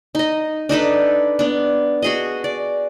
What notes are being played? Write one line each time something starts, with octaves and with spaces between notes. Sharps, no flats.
D#4 D#5
D4 D#4 A4 B4
B3 D4
F#4 G#4 D#5
D5